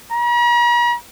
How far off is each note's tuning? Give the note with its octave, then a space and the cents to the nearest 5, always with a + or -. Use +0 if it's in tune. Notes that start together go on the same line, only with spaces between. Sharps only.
A#5 +45